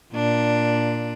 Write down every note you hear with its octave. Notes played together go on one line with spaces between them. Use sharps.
A#2 D4